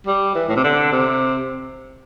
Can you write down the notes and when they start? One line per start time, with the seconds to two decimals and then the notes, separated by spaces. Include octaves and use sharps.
0.07 G3
0.35 E3
0.49 A2
0.56 C3
0.64 D3
0.92 C3